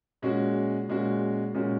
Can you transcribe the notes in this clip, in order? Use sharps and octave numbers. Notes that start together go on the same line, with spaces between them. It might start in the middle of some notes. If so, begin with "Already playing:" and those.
A#2 G#3 C#4 F#4
A#2 G#3 C#4 F#4
A#2 G#3 C#4 F#4